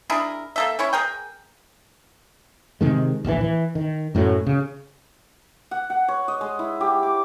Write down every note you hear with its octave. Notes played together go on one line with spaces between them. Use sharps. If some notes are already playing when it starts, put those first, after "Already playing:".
D4 E4 G#4 A#4
A#3 A4 E5
C#4 E4 C#5
G#4 A#4 G5
C3 D#3 G#3
D1 A#1 A#2 E3
E3
D#3
F#2 A2 D3 F#3
C#3
F#5
F#5
C#5
D#5
G#3
E4
G4
D6